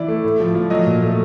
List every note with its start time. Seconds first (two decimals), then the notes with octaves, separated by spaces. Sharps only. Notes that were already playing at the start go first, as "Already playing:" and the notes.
Already playing: E3 D5
0.08 A3
0.24 A2
0.40 F3
0.55 F3
0.70 F#3 D#5
0.86 A#2
1.02 A3